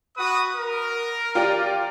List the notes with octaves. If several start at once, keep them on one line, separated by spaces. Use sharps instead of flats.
F#4 B4 D#6
A#4
F4 G4 D5